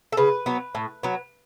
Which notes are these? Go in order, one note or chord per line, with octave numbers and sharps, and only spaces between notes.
A4
C#3 B4
F#3 B3
A2
F#3 B3